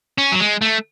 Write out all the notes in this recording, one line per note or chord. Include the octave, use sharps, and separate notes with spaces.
C#4
F#3
G#3
A3